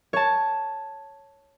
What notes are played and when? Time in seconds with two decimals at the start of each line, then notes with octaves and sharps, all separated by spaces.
0.13 C#5 A5